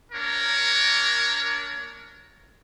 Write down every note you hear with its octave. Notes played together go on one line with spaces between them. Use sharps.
A#3 D4 A#4 C#5